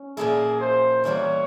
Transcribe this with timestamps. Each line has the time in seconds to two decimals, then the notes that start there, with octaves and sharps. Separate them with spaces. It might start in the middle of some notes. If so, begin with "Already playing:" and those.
Already playing: C#4
0.17 A#2 F3 A#3 E4 G#4
0.61 C5
1.04 E2 E3 G3 A#3 E4 C#5